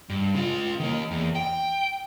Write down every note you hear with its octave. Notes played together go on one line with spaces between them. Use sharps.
G2
C#3 F4
D#3 A#3
E2
G5